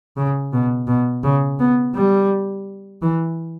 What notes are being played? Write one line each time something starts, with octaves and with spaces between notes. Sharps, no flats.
C#3
B2
B2
C#3
B3
G3
E3